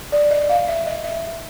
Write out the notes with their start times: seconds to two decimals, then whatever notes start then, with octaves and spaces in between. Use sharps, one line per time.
0.12 D5
0.31 D#5
0.49 F5
0.68 E5
0.87 D#5
1.04 E5